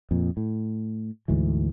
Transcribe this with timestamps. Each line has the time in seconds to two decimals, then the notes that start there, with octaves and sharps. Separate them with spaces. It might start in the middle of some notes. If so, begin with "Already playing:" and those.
0.11 F2 A#2
0.37 A2
1.28 D2 G#2 E3